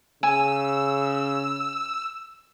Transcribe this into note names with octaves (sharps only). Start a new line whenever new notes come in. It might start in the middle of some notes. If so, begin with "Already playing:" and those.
C#3 G#5 E6